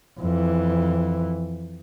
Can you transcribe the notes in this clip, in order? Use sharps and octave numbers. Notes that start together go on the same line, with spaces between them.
F2 E3